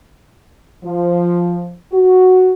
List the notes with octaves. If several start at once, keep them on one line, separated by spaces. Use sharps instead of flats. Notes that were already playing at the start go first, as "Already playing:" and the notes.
F3
F#4